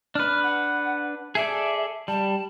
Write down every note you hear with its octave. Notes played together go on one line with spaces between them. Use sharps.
D4 B4 F6
F#5
G#4 A4 D5 E5
G3 A5